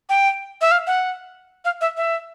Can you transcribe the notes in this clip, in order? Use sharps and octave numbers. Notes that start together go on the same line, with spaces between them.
G5
E5
F5
F#5
F5
E5
E5